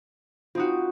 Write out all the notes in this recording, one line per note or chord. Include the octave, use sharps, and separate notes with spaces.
C4 D#4 F4 F#4